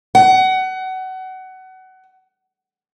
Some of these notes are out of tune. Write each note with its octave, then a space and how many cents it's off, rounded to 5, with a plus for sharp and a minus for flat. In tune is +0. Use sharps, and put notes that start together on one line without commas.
F#5 +25